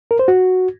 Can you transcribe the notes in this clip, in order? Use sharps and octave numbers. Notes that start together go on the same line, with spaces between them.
A#4
C5
F#4